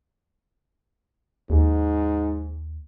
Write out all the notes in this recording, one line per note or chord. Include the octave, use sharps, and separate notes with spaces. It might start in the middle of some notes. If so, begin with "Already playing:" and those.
D#2 G#2